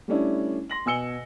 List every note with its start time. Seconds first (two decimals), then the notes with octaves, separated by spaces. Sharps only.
0.08 G3 A3 C#4 D4 E4
0.70 C6 A#6 F#7
0.86 B2 G#5 E6 C#7 G7